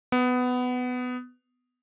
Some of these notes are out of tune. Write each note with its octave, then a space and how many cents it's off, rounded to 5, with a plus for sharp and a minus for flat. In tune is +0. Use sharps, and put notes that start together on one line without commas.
B3 +15